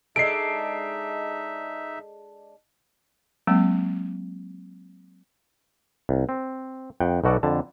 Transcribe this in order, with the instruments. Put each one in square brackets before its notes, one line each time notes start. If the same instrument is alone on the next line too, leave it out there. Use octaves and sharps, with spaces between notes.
[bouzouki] G#3 D4 A4 [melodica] D#4 E5 [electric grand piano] C7 D7
[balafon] F#3 G#3 A#3 C4
[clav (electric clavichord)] C2
C4
F2 F#5 G5
B1 B2 F#4 A4 D5
F2 D3 A5